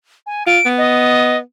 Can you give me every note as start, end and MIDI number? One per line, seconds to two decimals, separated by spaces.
0.27 0.46 80
0.47 0.59 65
0.47 0.68 98
0.65 1.40 59
0.78 1.37 75